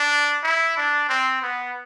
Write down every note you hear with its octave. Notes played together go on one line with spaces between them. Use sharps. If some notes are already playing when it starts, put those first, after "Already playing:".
Already playing: D4
E4
D4
C4
B3